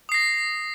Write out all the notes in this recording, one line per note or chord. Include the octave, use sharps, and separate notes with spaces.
D#6 A#6 C7